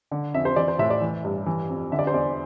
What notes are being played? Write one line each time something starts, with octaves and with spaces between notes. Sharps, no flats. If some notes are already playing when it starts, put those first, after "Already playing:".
D3
F2 E5
C5
E3 D5
C5
A2 E5
D5
E3
G2
E3
F2
D3 E5
D5
C5
E2 D5